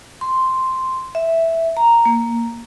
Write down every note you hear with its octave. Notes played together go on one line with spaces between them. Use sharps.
C6
E5
A#5
A#3